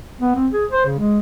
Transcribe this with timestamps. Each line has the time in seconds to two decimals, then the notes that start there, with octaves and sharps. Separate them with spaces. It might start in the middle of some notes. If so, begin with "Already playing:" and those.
0.21 B3
0.36 C4
0.52 G#4
0.71 C5
0.86 C#3
0.98 G#3